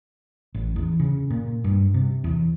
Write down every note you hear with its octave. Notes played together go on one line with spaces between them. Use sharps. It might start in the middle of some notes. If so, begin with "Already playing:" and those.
A1
E2
C#3
A#2
G2
C3
E2